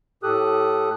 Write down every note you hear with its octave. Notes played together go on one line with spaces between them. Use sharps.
A2 G4 A4 D#6 F#6